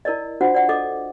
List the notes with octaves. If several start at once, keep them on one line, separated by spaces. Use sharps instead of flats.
E4 A#4 D5 D#5
D4 F4 F#4 C5 F#5
D5 F#5
A4 D#5 D6